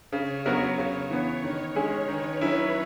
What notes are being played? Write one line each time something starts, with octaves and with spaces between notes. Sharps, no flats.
C#3 C#5
F#3 B3 F#4 A#4 C#5
C#3
E3 B3
D#3
G#3 C#4 G#4
D#3 B4
F#3 C#4 E4